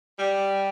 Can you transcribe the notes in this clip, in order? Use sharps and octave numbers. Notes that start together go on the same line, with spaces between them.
G3